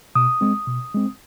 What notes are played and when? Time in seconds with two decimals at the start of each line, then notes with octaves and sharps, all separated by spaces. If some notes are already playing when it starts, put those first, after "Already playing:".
0.15 B2 D#6
0.41 G#3 C4
0.68 B2
0.95 G#3 C4